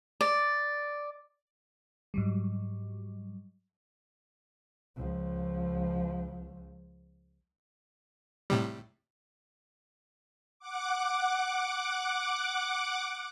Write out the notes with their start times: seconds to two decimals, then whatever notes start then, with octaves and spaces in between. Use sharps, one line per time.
0.21 D5
2.14 G#2 F#3 G3
4.96 C#2 F3
8.50 A2 C3 G3
10.59 F#5 D6